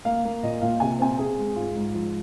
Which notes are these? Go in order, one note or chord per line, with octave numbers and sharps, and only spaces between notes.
A#3 F5
A#3
A#2 D#5
A#2 F5
C3 G#5
C4 G#5
C4 G#4
G#3
G#2 F4
G#2
F3